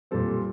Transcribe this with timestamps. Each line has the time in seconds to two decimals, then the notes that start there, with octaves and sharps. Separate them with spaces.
0.11 A#2 G3 C4 A4